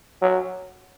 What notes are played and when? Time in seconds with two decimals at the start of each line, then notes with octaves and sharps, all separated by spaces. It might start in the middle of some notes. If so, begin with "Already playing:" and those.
0.22 F#3